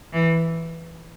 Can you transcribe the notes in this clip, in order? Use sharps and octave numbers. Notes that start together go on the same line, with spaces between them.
E3